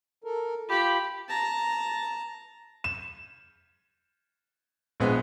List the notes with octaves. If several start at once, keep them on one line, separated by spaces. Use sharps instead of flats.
A4 A#4
F4 G4 B5
A5 A#5
E7
A#1 G#3 B3